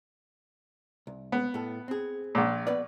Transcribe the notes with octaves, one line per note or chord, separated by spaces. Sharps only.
C2
B3
A2 A4
C4 G#4
A#1 A#2
B3 B4 D5